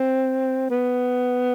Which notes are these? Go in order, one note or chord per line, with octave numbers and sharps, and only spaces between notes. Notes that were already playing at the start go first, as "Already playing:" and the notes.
Already playing: C4
B3